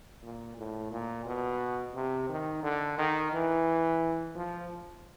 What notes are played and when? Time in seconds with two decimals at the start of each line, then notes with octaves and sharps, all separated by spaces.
0.22 A#2
0.57 A2
0.91 A#2
1.25 B2
1.94 C3
2.29 D#3
2.63 D3
2.98 D#3
3.32 E3
4.35 F3